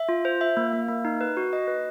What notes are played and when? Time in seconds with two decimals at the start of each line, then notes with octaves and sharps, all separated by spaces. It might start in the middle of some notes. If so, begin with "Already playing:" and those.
Already playing: E5
0.09 F4
0.25 C5
0.41 E5
0.57 A#3
0.73 A#3
0.88 A#3
1.05 D#4
1.21 B4
1.37 F#4
1.53 D#5
1.68 B4